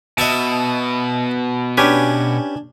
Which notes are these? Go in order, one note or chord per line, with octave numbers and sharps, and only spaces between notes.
B2 D#5 E5 A5
C#4 D4 G4 B4 G#5